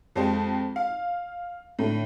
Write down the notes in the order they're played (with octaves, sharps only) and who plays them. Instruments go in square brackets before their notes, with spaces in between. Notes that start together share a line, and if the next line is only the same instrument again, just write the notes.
[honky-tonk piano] F2 G#3 G4 C5
F5
A2 D3